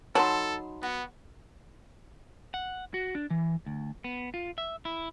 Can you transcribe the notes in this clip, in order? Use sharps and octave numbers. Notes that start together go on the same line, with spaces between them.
F#3 D#4 A4 A#4 A5 B5 C6
B3 F#4
F#5
F#4
D4
E3
D2
B3
F4
E5
E4